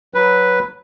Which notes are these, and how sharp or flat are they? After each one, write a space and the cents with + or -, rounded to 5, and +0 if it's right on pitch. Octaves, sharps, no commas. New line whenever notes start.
F#3 +0 B4 +0